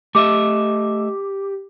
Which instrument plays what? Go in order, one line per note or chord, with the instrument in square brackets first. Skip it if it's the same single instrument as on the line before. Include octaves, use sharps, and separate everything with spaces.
[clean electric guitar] A3 D#5 E5 [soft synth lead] G4 [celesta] D6